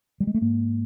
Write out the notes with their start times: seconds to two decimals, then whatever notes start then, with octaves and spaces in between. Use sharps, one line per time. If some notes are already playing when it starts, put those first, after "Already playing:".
0.20 G3
0.27 G#3
0.34 A3
0.41 G#2 A#3